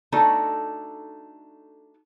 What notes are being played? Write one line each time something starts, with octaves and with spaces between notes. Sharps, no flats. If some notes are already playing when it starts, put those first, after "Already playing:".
A3 D4 D#4 F#4 A4